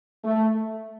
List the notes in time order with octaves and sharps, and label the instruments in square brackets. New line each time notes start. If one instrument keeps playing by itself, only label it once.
[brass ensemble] A3